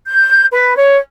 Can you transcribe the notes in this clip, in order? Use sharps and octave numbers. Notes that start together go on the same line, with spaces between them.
G6
B4
C#5